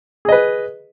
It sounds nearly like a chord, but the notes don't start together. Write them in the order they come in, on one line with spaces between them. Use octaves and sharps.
G#4 D#5 B4